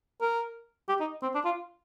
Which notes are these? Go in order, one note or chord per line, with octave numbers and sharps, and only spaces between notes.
A#4
G4
D#4
C4
D4
F4